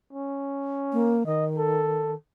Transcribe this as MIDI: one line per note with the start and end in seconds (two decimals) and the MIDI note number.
0.13 1.20 61
0.93 1.23 58
1.26 2.15 51
1.26 1.45 75
1.57 2.13 69